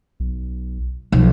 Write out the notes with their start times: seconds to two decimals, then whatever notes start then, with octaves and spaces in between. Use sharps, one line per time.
0.20 B1
1.12 B1 F3